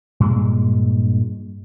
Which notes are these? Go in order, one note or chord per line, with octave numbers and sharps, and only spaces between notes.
G2 A#2 G#3